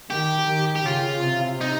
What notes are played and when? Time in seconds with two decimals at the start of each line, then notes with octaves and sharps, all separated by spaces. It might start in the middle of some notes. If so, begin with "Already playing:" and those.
0.10 D#3 G4
0.48 D#3
0.76 G4
0.86 C#3 F4
1.23 C3
1.61 D#4